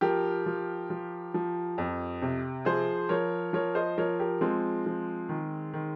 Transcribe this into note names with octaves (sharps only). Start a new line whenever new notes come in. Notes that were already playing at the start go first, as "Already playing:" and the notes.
F3 G4 A#4
F3
F3
F3
F2
C3
F3 G#4 C5
F3 A#4 C#5
F3 A#4 C#5
C5 D#5
F3 A#4 C#5
G4 A#4
F3 G#3 C4
F3
D#3
D#3